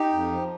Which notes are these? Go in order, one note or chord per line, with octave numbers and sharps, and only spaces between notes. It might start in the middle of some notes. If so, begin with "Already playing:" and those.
Already playing: D#4 G4
F2
F3